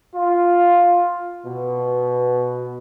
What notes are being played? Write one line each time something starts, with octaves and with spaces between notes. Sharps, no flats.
F4
B2